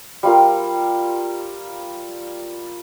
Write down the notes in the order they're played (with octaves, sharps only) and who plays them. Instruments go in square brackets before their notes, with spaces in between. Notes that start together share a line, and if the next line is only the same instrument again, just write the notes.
[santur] G3 F4 A#4